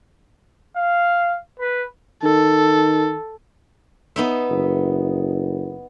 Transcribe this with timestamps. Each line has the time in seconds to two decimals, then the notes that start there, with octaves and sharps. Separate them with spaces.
0.76 F5
1.60 B4
2.23 D#3 A4
4.16 B3 D#4 E5
4.50 F#1